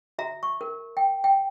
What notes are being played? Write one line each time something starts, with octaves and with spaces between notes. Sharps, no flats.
F#4 E5 A#5
C#6
A#4
G5
G5